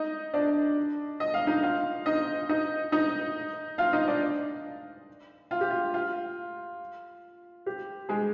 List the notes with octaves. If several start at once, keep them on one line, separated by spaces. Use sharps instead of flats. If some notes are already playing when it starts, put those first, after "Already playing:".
Already playing: D#4 D#5
D4 D5
D#5
F5
D#4 D#5
F4 F5
D#4 D#5
D#4 D#5
D#4 D#5
F4 F5
D#4 D#5
D4 D5
F4
G4
F4
F4
G4
G#3 G#4